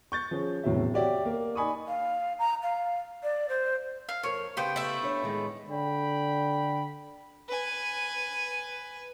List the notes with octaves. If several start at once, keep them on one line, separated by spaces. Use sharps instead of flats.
C#6 G6 A6
F3 C#4 G#4
E1 A2 C3 F#3 C#4 E5
F#4 G4 C#5 D5 E5 G5
A#3
D#4 D5 G#5 B5 C#6 D#6
F5
A#5
F5
D5
C5
F5
F2 A#4 C#5
C#3 B3 G4 C5 F5 G5
A3 E4
D4 C#5
A2 D#3 G#3
D3 G5 B5
B4 G#5